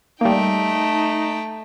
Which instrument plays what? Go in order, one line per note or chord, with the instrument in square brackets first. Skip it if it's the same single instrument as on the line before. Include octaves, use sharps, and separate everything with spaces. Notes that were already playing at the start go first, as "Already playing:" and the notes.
[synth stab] G3 A#3 [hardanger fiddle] A3 G5 [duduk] D#4